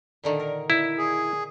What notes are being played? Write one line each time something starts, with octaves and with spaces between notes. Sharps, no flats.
A#2 D3 D#3
A#4
E4
G#4